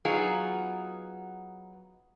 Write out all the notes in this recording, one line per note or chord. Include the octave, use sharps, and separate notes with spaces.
F#3 B3 D#4 F4 G#4